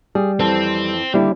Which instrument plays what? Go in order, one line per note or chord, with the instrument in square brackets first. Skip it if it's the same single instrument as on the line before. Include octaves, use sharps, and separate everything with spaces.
[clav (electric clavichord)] G3 [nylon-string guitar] G#4
[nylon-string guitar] F2 E3 A4 [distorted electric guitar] C4
[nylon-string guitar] D#2 D3 [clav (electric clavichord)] G3 E4